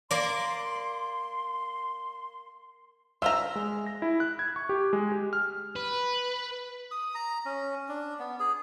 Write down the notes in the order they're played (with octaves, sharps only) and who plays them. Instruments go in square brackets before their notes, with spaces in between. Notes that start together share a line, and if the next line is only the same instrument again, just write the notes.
[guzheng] A#3 D5 [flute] C6
[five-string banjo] F4 C5 A#5 [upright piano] E5 E6
[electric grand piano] G#3
A#6
E4
F#6
G#6
C#6
G4
G#3
G4
F6
[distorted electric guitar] B4
[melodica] D#6
A#5
C#4
D4
B3
G#4